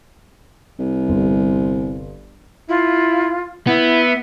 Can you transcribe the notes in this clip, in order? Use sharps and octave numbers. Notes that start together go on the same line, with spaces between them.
C2
G1
E4 F4
B3 E4 E5